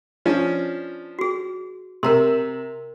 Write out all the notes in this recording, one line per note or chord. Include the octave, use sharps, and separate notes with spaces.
F3 C#4 D4
F#4 G#4
C3 A#4 A#5 C6